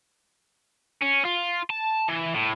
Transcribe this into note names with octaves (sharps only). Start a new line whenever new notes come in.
C#4
F4
A5
E3
A2